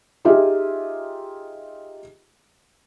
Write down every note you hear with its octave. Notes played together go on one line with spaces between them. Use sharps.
D#4 F4 G4 G#4 E5